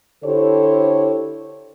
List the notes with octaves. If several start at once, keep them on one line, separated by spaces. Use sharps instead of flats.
D3 E4 G4 A4 C5 C#5